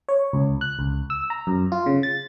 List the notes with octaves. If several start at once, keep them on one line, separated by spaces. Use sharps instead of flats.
C#5
C#2
F#6
C#2
E6
A#5
F#2
F4
C#3
A6